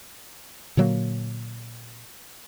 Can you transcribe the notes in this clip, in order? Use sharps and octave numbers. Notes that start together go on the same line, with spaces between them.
A#2 D3 F#3 A#3